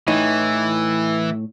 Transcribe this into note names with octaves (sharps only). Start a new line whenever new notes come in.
A2 E3 D#4